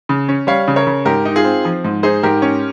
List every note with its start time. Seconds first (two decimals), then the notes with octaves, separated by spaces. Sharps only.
0.09 C#3
0.29 C#4
0.47 G3 C#5 F5
0.68 C#3
0.76 A#4 C#5
0.87 C#3
1.05 G#2 G4 A#4
1.25 D#4
1.36 F4 G#4
1.45 C4
1.65 F3
1.84 G#2
2.03 D#4 G#4 C5
2.23 G#2 G4 A#4
2.42 C#4